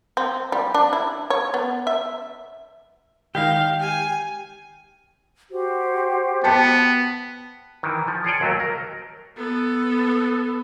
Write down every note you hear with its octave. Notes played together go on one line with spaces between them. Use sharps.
C4
G3
D4
E4
C#5
B3
E5
D#3 G#3 D#4 G4 F5
G#5
F#4 G4 C5
B3 G5 A5 C#7
D#3 E3
F3
G#4 C#5 D5 G5
D#2 F#3 A3
A#4
B3 A4